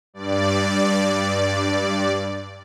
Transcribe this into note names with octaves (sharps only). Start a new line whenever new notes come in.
G2 D5